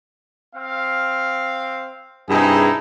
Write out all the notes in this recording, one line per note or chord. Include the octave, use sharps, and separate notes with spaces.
C4 F5
G2 C3 D#4 E4 G#4